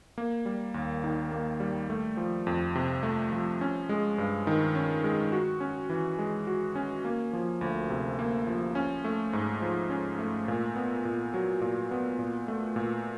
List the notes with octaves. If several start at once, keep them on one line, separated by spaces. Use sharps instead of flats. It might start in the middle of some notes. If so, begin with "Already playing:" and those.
A#3
G3
D#2
D#3
A#3
G3
A3
F3
F2
C3
A3
F3
C#4
G#3
G2
D#3
C#4
G#3
F#4
C#4
E3
G#3
F#4
C#4
A#3
F3
D2
C3
A#3
F3
C#4
A3
G#2
F3
C#4
A3
A#2
B3
A#2
F#3
A#2
B3
A#2
A3
A#2